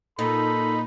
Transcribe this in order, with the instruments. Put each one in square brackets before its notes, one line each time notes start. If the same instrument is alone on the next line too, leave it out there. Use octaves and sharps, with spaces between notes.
[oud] A#2 [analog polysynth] D#4 [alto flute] A4 [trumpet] B5